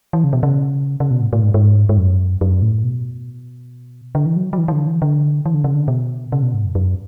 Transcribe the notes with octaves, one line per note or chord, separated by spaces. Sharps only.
E3
C#3
B2
C#3
C#3
B2
A2
A2
G#2
G#2
G#2
F#2
F#2
A2
B2
D3
E3
F#3
F#3
E3
E3
D3
E3
D3
E3
D3
C#3
D3
B2
C#3
B2
G#2
F#2
F#2